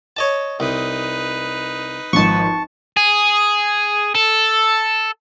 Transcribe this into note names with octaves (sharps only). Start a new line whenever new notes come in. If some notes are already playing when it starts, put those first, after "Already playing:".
C#5 D#5 A5
C2 D#4 B4
G#1 F3 A5 C#6
G#4
A4